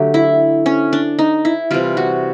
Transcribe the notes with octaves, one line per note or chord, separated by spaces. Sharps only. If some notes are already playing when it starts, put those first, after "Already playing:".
Already playing: D3 F#3 A3 G4
E4
C#4
D4
D#4
E4
C3 E3 G3 F4
F#4